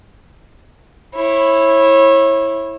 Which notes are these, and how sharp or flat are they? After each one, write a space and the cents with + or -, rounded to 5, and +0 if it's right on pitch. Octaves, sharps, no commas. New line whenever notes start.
E4 +0 C#5 -30